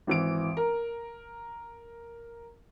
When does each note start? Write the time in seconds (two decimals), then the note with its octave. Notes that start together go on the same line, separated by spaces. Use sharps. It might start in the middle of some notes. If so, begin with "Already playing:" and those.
0.07 G#1 E3 D7
0.57 A#4